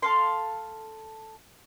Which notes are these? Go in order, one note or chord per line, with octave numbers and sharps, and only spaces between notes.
A4 F5 C6